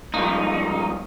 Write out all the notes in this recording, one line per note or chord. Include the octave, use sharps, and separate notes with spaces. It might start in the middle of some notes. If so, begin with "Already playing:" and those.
C#2 G2 F3 D#4